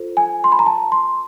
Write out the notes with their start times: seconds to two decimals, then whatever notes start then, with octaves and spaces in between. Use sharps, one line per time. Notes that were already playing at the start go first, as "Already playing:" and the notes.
Already playing: F4 A4 C5
0.17 G#5
0.44 C6
0.52 B5
0.59 A#5
0.66 A5
0.92 C6